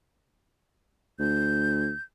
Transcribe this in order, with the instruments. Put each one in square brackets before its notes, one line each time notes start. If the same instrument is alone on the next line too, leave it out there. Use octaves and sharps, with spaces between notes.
[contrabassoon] D2 [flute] G6